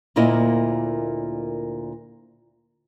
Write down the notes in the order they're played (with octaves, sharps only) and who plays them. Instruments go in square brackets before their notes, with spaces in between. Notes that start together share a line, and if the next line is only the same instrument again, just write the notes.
[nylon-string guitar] D2 A#2 A#3 E4 D#5